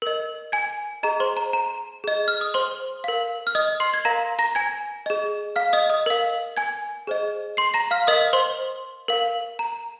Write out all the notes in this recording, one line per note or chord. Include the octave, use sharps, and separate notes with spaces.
A#4 D#5
G#5 G#6
G#4 D#5 A#5
C5 C6
A#5
A#5
G#4 D#5
F6
D#6
C5 C6
A#4 F5
F6
D#5 D#6
C6 C7
G#6
A#4 F5 A#5 A#6
A#5 A#6
G#5 G#6
G#4 D#5
F5 F6
D#5 D#6
D#5 D#6
A#4 F5
G#5 G#6
G#4 C5 D#5
C6 C7
A#5 A#6
F5 F6
A#4 D#5 F5 D#6
C5 C6
A#4 F5
A#5